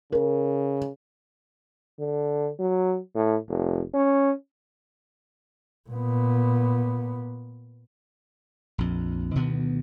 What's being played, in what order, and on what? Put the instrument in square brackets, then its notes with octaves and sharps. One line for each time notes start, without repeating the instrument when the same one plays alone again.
[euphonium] C#3 [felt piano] A#4
[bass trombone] D3
F#3
A2
F1
C#4
[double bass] A#2 B3
[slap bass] A#1 F2
D2 B2 D#3 B3